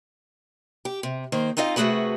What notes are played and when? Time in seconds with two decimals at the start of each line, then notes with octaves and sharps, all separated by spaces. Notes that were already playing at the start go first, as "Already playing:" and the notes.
0.85 G4
1.03 C3
1.32 D#3 A#3 C5
1.57 C4 D#4 F4 D#5 F5
1.76 C3 A3 C#4 F#4 G#4 B4